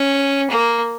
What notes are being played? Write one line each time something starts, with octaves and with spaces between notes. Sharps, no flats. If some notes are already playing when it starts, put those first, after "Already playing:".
Already playing: C#4
A#3